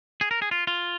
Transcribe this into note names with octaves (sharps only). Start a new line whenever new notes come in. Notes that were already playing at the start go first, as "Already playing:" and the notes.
G#4
A#4
G#4
F4
F4